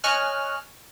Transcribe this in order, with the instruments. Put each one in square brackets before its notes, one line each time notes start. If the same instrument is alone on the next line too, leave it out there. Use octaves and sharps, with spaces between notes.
[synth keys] C#5 D#5 G#5 F6 F#6